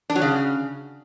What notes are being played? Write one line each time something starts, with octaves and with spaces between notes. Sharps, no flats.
D4
F#3
C#3